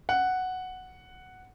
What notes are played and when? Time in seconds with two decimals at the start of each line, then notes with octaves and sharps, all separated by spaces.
0.09 F#5